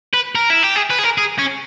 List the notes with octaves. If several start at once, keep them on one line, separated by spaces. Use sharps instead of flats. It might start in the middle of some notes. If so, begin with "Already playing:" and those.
B4
A#4
E4
G4
G#4
B4
G#4
A#4
G#4
C#4